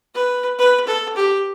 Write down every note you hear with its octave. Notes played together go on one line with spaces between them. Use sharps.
B4
B4
A4
G4